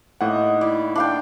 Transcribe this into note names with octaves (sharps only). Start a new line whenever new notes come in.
A2 A#3 D#4 D#5 F#5
E4 D5
D4 F5 G5